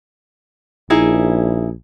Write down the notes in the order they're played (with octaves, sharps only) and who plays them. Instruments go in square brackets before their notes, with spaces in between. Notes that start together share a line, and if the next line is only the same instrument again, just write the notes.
[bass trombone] A#1 [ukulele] D#4 E4 G#4